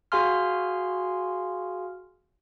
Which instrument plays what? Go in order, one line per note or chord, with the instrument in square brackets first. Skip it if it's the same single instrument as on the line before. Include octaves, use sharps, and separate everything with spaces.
[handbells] F#4 G#4 F5 G#5 C6 F6